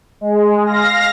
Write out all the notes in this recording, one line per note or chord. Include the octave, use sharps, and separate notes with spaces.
G#3
F5 A#6